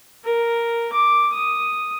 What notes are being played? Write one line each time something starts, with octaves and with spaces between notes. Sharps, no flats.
A#4
D6
D#6